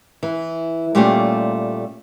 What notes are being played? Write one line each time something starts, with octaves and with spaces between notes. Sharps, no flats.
E3
A#2 G3 A3 C#4 F4 G4